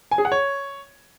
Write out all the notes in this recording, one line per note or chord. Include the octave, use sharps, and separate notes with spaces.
G#5
G#4
F#5
C#5